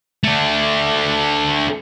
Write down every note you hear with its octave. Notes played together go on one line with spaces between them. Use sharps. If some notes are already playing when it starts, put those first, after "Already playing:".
A3 D4